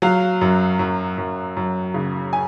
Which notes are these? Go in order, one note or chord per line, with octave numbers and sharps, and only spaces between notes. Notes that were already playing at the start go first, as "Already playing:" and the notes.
F#3 F5
F#2
F#2
F#2
F#2
C#3
G#5